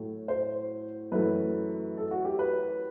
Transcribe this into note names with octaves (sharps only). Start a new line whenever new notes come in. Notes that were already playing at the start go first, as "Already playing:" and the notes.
Already playing: A2 F#3 A3
C5
F#2 E3 A3 B4
A4
F#4
G4
B4